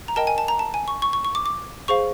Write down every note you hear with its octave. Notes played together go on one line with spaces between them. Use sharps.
A#5
A#4 D#5 G5 A5
G#5
A5
A#5
A5
G#5
C#6
C#6
C#6
C#6
D6
D6
G#4 C5 F5 C#6